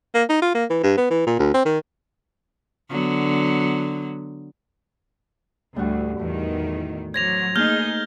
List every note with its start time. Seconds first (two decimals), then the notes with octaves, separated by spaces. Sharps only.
0.14 A#3
0.29 D#4
0.42 F4
0.55 A#3
0.70 E3
0.83 G2
0.97 B3
1.10 E3
1.26 A#2
1.39 D2
1.54 C4
1.65 D#3
2.90 D3 F#3 B3
5.76 D2 A2 G3 F#4
6.19 E2 D#3 A3
7.14 F#3 C5 C6 D6 G#6 A#6 F7
7.56 A3 A#3 D#4 G#4 F6 G6 G7